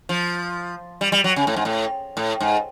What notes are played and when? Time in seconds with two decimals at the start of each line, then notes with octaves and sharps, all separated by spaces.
0.09 F3
1.01 G3
1.12 G3
1.24 F#3
1.36 C#3
1.47 A2
1.56 G#2
1.65 A2
2.17 A2
2.41 G#2